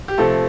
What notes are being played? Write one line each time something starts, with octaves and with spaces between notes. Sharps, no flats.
G4
C3 F3 A3 A4